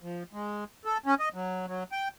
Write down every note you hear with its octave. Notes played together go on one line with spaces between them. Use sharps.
F3
G#3
A4
C#4
D#5
F#3
F#3
G5